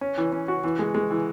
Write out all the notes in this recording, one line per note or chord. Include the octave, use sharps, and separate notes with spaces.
C#4
E3
C#4
F#4
E3
G#3
G#3
E3